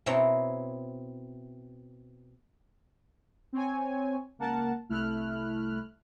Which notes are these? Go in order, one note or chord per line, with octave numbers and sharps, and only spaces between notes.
B2 C4 E4 C#5 A#5
C4 C#5 G#5
C#2 A#3 A#4 F#5 A5
C2 A3 E4 F6 F#6